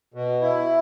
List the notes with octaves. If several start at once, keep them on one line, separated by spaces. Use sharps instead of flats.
B2
E4